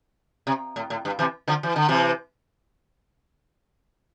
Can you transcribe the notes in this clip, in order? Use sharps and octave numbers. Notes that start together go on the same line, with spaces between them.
C3
A2
A2
G2
C3 E3
D3 F3
E3
D3
C3 E3